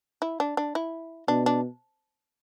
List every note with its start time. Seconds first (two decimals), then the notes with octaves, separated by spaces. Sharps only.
0.22 E4
0.40 D4
0.57 D4
0.75 E4
1.28 B2 D4
1.46 D4